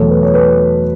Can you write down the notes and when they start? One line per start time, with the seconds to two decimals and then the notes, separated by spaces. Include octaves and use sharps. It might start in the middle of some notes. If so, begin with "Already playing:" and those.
Already playing: E2 B2 F#3 A3 A4 C#5
0.10 B4
0.22 C#5
0.34 B4